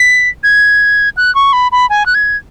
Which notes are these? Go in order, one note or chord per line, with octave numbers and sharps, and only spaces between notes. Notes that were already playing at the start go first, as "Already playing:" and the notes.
Already playing: B6
G#6
F#6
C#6
B5
B5
G#5
F#6
G#6